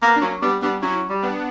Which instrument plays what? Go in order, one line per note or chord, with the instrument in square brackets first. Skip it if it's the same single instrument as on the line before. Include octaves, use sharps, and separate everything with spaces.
[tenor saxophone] A#3 [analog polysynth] B3
[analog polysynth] D4
[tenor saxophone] F#3 [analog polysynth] A#3 C#4
[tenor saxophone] G3 [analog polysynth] B3 D4
[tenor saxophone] G3 [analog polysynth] B3 D4
[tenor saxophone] F#3 [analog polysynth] C#4 E4
[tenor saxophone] G3
[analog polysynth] B3 D4